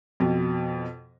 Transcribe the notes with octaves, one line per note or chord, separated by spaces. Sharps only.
F2 B2